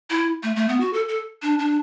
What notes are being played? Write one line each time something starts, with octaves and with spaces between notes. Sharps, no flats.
E4
A3
A3
B3
F#4
A4
A4
D4
D4